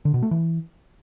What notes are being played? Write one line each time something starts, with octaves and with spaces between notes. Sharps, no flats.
D3
B2
A3
E3